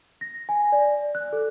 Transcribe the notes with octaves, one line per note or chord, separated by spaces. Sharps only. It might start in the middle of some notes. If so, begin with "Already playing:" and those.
A#6
G#5
D5
F#6
A4